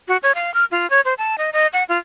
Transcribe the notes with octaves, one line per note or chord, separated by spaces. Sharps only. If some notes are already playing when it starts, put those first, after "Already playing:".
F#4
C#5
F5
F6
F4
C#5
C5
A5
D#5
D#5
F#5
F4